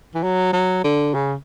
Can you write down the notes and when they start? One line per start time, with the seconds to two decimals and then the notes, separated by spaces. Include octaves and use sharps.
0.14 E3
0.23 F#3
0.53 F#3
0.84 D3
1.14 C#3